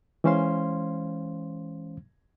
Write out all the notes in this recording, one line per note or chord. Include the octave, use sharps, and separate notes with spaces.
E3 G#3 C#4 C5 F5 C6